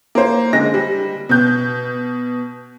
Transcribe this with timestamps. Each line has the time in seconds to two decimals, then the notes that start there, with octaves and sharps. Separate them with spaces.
0.15 A#3 C5
0.53 D3 G#3 A#6
0.74 G3
1.29 B2 G6